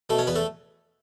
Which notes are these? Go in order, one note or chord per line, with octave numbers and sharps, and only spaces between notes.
B2 A3 A4
C#4 C#5
E2 B3 B4
A3 A4